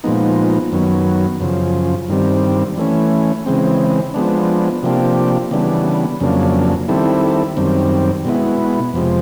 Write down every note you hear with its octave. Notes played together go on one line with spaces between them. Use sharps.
A#2 F3 G#3 B3 D#4
F#2 D#3 F#3 B3
F#2 C#3 F3
G2 D#3 G3 C4
E3 A3 C#4
C#3 E3 G#3 C4
F3 G#3 B3 D4
C3 F3 A#3 D4 G4
C#3 E3 G3 B3 D4
F2 C#3 F#3 A#3 D4
D#3 G3 C4 E4 A4
F#2 D#3 G3 C4
B2 G#3 B3 E4
F2 C3 F3 G#3